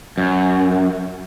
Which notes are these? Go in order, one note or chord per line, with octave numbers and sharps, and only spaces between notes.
F#2